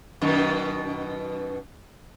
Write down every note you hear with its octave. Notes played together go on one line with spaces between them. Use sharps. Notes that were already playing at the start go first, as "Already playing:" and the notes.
F#2 B2 D#3